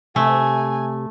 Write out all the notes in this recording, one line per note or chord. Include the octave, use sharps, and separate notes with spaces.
C3 A3 G#5